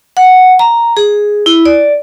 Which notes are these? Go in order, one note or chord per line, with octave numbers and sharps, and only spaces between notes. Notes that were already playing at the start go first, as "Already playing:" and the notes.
F#5
A#5
G#4
E4
D5